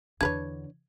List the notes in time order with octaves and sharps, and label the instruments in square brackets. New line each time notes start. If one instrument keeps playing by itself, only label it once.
[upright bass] E2 D3 [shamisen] D4 B4 C#5 [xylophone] G#6